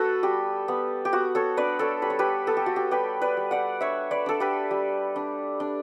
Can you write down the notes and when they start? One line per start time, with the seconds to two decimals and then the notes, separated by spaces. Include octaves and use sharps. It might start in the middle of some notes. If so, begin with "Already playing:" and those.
Already playing: B3 F#4 A4 B4
0.23 G3 G4
0.68 B3
1.05 G4
1.12 B3 F#4
1.35 A4 C#5
1.57 D4 B4 D5
1.79 A4 C#5
2.02 G3 B4
2.10 C#5
2.19 G4 B4
2.47 B3 A4
2.57 G4
2.66 F#4
2.76 G4
2.91 G3 G4 B4
3.22 B4 D5
3.37 G3
3.51 D5 F#5
3.81 D4 C#5 E5
4.11 B4 D5
4.26 D4 A4
4.40 G4 B4
4.71 G3
5.16 D4
5.60 D4